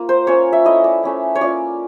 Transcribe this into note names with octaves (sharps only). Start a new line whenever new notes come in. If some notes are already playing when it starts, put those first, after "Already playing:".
Already playing: A#3 F4
C5
A#3 C#4 F4 C#5
E5
A3 C#4 E4 D#5
D5
A3 C#4 E4
C#5
A#3 C#4 F4 D5